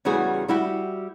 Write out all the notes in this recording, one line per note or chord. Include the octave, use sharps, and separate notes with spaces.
E2 C#3 G3 F#4 G#4
G3 E4 F#4 G4